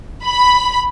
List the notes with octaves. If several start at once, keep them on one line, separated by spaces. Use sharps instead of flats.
B5